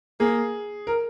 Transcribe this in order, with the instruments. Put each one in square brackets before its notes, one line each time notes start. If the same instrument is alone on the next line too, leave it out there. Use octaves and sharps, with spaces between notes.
[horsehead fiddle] A#3 [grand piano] G#4
[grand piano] A#4